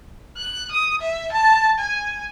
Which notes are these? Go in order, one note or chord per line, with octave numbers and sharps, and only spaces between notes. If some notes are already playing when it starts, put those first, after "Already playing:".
F#6
D#6
E5
A5
G#5